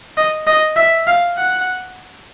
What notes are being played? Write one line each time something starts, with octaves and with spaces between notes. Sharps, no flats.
D#5
D#5
E5
F5
F#5